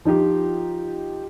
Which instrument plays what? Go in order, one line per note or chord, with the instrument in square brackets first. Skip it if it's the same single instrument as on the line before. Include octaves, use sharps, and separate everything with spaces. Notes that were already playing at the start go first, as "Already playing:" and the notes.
[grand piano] F3 D#4 F4 G4